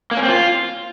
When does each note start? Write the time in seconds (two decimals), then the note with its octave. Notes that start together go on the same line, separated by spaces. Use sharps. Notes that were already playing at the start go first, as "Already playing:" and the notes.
0.11 A#3
0.17 C#4
0.23 C4
0.28 F4